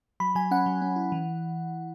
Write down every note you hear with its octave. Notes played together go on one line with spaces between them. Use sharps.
F#3 B5
F#3 G#5
C#4 F#5
F#3
C#4
E4
E3